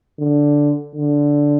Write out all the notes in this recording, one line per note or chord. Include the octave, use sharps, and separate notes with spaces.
D3
D3